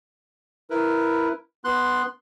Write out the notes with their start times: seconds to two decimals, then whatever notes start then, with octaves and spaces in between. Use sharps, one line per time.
0.70 E4 A#4 B4
1.64 B3 C6 F#6